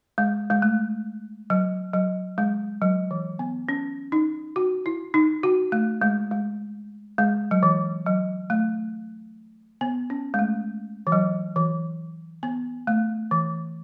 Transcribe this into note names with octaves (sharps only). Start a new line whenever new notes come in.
G#3
G#3
A3
F#3
F#3
G#3
F#3
E3
B3
C#4
D#4
F#4
E4
D#4
F#4
A3
G#3
G#3
G#3
F#3
E3
F#3
A3
B3
C#4
G#3
A3
E3
F#3
E3
B3
A3
E3